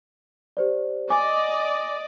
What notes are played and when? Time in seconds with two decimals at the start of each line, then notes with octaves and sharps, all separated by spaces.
0.57 G4 C5 D5
1.10 D5 D#5 G#5 D6